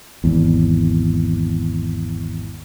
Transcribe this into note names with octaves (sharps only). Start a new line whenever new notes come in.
G#1 E2